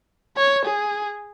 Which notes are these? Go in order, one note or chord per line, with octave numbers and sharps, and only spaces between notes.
C#5
G#4